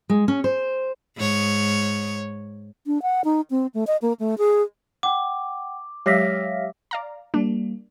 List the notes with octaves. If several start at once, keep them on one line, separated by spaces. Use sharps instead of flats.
G#3
C#4
C5
G#2 C#5
D4
F#5
D#4
C4
A3
D#5
A#3
A3
G#4
F#5 G5 D6
F#3 G#3 G4 C#5 E5 F5 A#6 B6
D5 F5 A#5
G3 A#3 D4